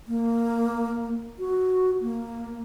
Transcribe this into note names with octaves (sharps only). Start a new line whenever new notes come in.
A#3
F#4
A#3